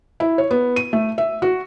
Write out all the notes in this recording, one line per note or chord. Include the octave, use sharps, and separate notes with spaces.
E4
C#5
B3
D#7
A3
E5
F#4